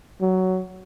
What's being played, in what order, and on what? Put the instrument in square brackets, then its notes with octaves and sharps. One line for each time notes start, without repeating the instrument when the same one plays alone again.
[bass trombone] F#3